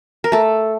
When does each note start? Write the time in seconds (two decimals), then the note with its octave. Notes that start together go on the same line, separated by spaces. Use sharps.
0.24 A#4
0.32 A3 A4